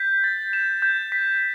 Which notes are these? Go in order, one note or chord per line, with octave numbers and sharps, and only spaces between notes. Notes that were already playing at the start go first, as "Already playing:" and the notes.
Already playing: G6 B6
A6
E7
G6
B6